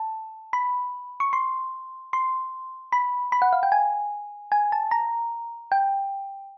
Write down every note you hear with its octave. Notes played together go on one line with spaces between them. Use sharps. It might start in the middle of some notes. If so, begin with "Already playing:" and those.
Already playing: A5
B5
C#6
C6
C6
B5
B5
F#5
F5
G5
G#5
G#5
A5
A#5
G5